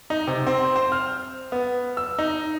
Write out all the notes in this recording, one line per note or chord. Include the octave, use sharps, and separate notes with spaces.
D#4
C3
C4
C5
F6
B3
E6
D#4